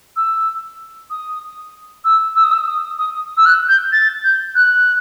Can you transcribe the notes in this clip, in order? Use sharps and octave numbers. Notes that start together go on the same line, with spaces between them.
E6
D#6
E6
E6
D#6
E6
D#6
D#6
E6
F#6
G6
A6
G6
F#6